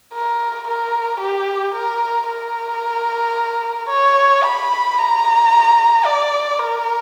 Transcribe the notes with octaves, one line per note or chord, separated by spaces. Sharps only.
A#4
A#4
G4
A#4
A#4
C#5
B5
A#5
D5
A#4